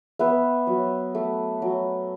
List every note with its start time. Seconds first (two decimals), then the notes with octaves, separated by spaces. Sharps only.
0.19 B3 B4 E5
0.67 F#3
1.15 A3
1.62 F#3